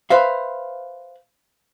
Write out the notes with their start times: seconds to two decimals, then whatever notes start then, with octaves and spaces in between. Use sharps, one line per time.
0.10 B4 C5 E5 F5